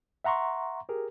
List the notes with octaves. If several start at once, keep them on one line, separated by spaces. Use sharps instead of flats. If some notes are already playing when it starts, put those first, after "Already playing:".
E5 F#5 A#5 C6 C#6
G4 G#4 A#4